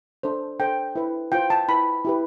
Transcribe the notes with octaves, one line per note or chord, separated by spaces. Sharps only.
D4 A4 C5
D4 A4 C5 G5
E4 B4
F4 C5 G5
A5
E4 B4 B5
E4 G4 B4